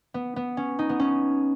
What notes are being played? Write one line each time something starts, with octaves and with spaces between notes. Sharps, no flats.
B3
B3
C#4
D#4
B3
C#4